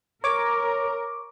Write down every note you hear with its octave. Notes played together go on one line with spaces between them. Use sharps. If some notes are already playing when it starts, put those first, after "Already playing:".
A#4 C#5 D6